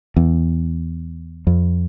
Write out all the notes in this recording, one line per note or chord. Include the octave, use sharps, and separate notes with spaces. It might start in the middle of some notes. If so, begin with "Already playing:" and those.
E2
F2